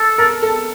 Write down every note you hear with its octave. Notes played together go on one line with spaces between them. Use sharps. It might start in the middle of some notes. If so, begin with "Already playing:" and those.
Already playing: A4
A#4
A4